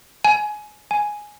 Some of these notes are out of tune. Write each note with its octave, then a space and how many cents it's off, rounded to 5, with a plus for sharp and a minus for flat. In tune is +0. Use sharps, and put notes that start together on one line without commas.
G#5 +20
G#5 +5